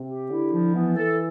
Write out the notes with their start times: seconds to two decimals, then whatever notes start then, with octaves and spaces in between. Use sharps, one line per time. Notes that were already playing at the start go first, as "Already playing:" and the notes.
Already playing: C3 C4
0.08 G4
0.30 D3 E4
0.52 F3
0.74 E3 B3
0.96 A4